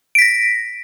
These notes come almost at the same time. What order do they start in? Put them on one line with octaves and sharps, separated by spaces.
D7 B6 A#6